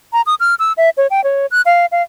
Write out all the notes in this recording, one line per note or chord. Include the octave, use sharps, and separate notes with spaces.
A#5
D#6
F6
E6
E5
C#5
G5
C#5
F#6
F5
F5